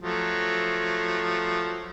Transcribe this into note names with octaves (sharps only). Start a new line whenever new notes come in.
F3 F#3 A3